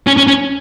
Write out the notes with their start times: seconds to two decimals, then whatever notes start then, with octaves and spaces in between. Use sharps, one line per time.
0.07 C#4
0.17 C#4
0.27 C#4